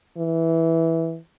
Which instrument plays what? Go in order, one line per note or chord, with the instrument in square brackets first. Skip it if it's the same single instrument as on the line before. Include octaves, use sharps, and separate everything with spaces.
[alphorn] E3